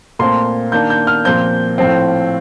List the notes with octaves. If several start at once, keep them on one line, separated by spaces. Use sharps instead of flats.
A#2 A3 C4 C6
D#3 A#3 D4 G6
G6
F6
A#2 F3 C4 G6
A2 F3 C4